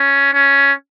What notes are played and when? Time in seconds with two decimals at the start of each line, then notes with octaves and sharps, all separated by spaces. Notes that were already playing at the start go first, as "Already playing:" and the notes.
Already playing: C#4
0.34 C#4